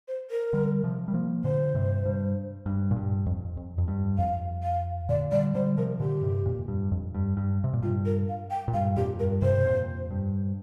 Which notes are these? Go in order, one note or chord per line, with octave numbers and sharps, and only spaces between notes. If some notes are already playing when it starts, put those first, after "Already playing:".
C5
A#4
D3 G3
C3 F3
G3
F3 A#3
A#2 D3 C5
G2 C3
G2
G2
A#2
G2
F2
F2
F2
G2
F2 F5
F5
A#2 D3 D5
D3 G3 D5
D3 G3 C5
C3 F3 A#4
A#2 D3 G4
G2 C3
F2 A#2
G2
F2
G2
G2
C3
A#2
G2 F4
A#4
F5
G5
A#2
G2 F5
F2 A#2 G4
G2 A#4
G2 C3 C5
C3
F2 A#2
G2